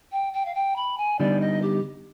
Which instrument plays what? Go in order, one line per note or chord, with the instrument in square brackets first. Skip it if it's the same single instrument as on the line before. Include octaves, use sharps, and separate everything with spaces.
[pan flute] G5
G5
F5
G5
B5
G#5
[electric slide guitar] D3 G3 B3 D#4 [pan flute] D5
[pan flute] D#5
G4